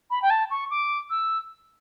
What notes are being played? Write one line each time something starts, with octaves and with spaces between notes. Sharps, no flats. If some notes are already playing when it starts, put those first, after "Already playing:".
B5
G5
A5
C#6
D6
E6